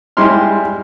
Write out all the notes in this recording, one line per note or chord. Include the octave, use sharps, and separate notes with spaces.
G3 G#3 E4 C6 F6